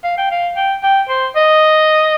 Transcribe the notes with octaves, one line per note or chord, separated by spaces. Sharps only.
F5
G5
F5
G5
G5
C5
D#5